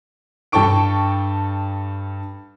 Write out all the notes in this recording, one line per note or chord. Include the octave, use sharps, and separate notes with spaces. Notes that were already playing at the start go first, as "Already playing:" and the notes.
G2 A4 G5 A5 C#6 D7